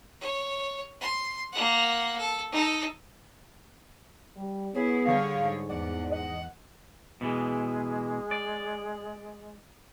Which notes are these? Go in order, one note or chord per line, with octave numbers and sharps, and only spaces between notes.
C#5
C6
A#3 F#5
A4
D#4 A4
G3
B3 E4 G#4 C#5
D3 G3 C#5 F5
G#2
E2 D5 F#5
D#5 F#5
B2 E3 G#3
D5